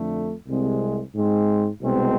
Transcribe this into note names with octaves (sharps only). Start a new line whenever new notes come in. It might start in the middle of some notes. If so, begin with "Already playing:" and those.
Already playing: F2 D3 A3
C2 C3 G#3 C4
G#2 G#3 C4
C2 B2 G#3 C4